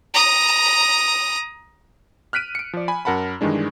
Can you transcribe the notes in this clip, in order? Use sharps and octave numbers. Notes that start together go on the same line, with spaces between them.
A#5 D#6
F6 F#6 B6 D7 D#7
C#7 D7
F3 D5
G#5 B5
F#2 A#4 F#5 A5 B5
G2 D#3 E3 G#3 D4